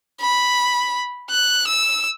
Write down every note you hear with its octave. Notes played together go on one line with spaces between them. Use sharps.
B5
F#6
E6